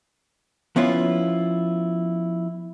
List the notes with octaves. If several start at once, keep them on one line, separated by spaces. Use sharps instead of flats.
F3 B3 C#4 E4 F4